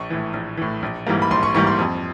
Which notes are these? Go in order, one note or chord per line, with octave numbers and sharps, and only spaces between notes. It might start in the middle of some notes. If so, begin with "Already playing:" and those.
Already playing: A#1 C#6
A2 E3
A#1
A2 E3
A#1
G#2 E3 G3 A#3
B5
A#1 C6
C#6
G#2 E3 G3 A#3 C#6
C6
F2